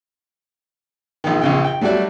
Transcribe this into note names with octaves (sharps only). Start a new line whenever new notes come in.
A#1 D#3
A#1 C#3 G5
G5
F#3 G3 A3 F#4 D5